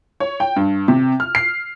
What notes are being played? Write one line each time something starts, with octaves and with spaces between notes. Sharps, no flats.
C#5
G5
G2
C3
F6
C7